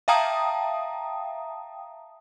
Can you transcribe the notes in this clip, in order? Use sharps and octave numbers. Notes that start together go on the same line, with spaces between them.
E5 F5 G5 A5 A#5 D#6